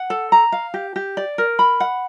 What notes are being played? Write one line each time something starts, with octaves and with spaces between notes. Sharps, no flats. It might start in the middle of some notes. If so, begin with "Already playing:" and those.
Already playing: F#5
A4
A#5
F5
G4
G4
D5
A#4
B5
F#5